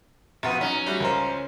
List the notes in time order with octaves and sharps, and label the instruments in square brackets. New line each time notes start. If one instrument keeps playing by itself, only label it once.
[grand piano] A#1 [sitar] B2 B3
[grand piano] F#3 D#4 [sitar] C#4
[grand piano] G3 A3 F#4
C#2 A#4 C5